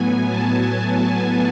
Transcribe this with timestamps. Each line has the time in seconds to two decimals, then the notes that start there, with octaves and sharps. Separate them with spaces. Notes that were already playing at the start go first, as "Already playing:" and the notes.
Already playing: A2 F#3 B3 G#5
0.29 A5
0.81 G#5